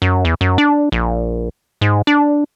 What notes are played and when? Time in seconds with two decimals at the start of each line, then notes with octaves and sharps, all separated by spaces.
0.02 F#2
0.25 E2
0.41 F#2
0.58 D4
0.92 A#1
1.81 G#2
2.07 D4